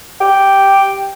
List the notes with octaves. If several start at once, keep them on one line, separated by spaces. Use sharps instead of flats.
G4